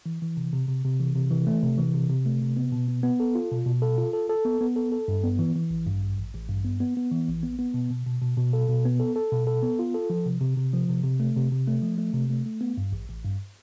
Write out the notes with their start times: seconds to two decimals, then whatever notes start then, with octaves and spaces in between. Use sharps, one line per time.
0.06 E3
0.22 E3
0.37 C3
0.53 C3
0.68 C3
0.85 C3
1.00 E3
1.15 C3
1.31 E3
1.47 A3
1.63 C3
1.78 E3
1.94 C3
2.09 C3
2.26 A3
2.41 C3
2.57 B3
2.72 B2
2.88 B3
3.03 B3
3.20 A4
3.35 F4
3.51 B2
3.66 B2
3.82 A4
3.98 F4
4.13 A4
4.29 A4
4.45 B3
4.61 B3
4.76 A4
4.92 A4
5.08 G2
5.24 B3
5.39 E3
5.55 E3
5.70 A1
5.86 G2
6.02 A1
6.17 A1
6.34 A1
6.49 G2
6.65 B3
6.80 B3
6.97 B3
7.12 E3
7.28 A1
7.43 B3
7.59 B3
7.74 B2
7.90 B2
8.06 B2
8.22 B2
8.37 B2
8.53 A4
8.69 B2
8.85 B3
9.00 A4
9.16 A4
9.32 B2
9.47 A4
9.63 B3
9.79 F4
9.94 A4
10.10 F3
10.26 C3
10.41 C3
10.57 C3
10.73 F3
10.89 C3
11.04 C3
11.20 A3
11.36 C3
11.51 C3
11.67 A3
11.82 F3
11.98 A3
12.14 C3
12.30 A3
12.46 A3
12.61 B3
12.77 G2
12.92 A1
13.08 A1
13.24 G2